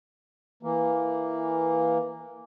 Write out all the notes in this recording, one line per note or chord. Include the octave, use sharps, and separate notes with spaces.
E3 A#3